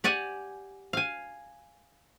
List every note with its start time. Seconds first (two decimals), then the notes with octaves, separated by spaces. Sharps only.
0.04 G4 D5 F#5 G#5
0.93 F5 G#5